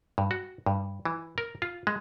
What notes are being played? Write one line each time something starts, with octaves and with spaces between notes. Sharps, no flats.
G2
F#4
G2
E3
A#4
F4
G#3